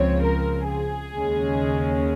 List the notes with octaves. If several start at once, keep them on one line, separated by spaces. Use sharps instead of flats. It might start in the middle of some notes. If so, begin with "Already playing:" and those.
Already playing: C#2 C#3 F3 C4 C#5
A#4
G#4
D#2 C#3 G#3 C#4